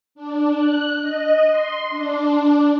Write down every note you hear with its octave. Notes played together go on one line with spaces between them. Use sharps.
D4
F#6
D#5
C6
D4